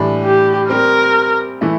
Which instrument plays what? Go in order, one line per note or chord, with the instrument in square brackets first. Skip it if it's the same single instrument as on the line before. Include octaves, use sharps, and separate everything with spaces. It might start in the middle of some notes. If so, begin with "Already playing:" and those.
Already playing: [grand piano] A2 E3 G3 D4
[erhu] G4
[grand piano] G3 C4 G4 [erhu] A#4
[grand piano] E3 A3 E4